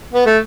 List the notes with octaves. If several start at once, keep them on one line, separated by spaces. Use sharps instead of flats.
B3
A3